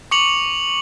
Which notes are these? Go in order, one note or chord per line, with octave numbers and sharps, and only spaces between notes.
C#6 D6 C#7 F7 F#7